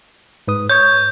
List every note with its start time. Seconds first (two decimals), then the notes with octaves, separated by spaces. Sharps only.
0.48 G#2 B4 D#6
0.70 C#5 C#6 G6 G#6